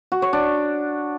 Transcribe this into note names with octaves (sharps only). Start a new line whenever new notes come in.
F#4
C#5
D4